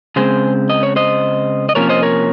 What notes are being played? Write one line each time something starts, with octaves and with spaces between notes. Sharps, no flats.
C#3 G#3 C4 G#4 C5
D#5
C#5
C5 D#5
D#5
C3 F3 A#3 C#4 A#4 C#5
C5 D#5
A#4 C#5